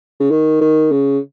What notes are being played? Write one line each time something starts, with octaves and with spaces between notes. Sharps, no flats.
C#3
D#3
D#3
C#3